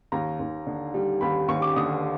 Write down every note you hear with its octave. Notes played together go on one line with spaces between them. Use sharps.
D#2 A#5
D#2
D3
G3
D#2 B5
D#2 C#6
D6
D3 D#6